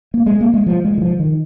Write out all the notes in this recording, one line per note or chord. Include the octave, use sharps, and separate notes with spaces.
A#3
G#3
A#3
G#3
F3
G#3
D#3
F3
D#3